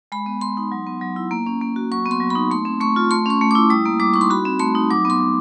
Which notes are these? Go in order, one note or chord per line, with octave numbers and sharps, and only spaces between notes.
G#3 B5
B3
G#3 C6
D#4
F#3
B3
F#3
E4
A#3
C#4
A#3
F#4
F#3 C#6
B3
C6
F#3
B5
D#4
A3 C6
C4
A3 C#6
F4
A3 C6
C#4 C#6
A3
D6
E4
G3 D#6
A#3
G3 D6
D#4 C#6
C6
F#4 B5
C4
A3 C6
D#4
F#3 D6
B3 C6
F#3